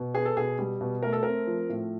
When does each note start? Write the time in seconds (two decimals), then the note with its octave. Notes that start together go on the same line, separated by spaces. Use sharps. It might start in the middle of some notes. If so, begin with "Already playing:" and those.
Already playing: B2
0.14 B3 G#4
0.25 A4
0.37 B2 G#4
0.59 G3
0.81 B2
1.03 A3 A#4
1.12 A4
1.23 C4 A#4
1.47 F3
1.69 A2